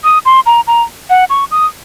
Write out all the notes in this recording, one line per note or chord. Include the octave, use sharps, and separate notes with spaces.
D#6
C6
A#5
A#5
F#5
C#6
D#6